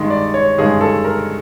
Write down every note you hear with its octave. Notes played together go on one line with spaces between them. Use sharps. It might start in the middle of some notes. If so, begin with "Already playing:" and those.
Already playing: G2 D#3 G#3
D5
C#5
G2 D#3 G#3 G#4
A4
A#4